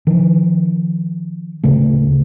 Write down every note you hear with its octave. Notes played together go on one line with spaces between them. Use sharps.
D#3 F3
D1 C#3 A3